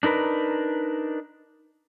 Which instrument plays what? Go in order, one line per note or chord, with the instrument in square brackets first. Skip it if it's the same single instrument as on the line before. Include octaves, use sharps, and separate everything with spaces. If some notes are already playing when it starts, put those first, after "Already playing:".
[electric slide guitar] D4 D#4 A#4 B4